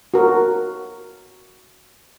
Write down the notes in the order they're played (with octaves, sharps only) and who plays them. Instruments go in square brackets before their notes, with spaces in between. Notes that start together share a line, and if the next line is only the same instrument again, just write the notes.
[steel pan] F#4 A#4